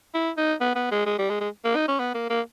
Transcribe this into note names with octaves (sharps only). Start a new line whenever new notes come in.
E4
D#4
B3
B3
G#3
G#3
G3
G#3
G#3
A#3
D#4
C#4
B3
A#3
A#3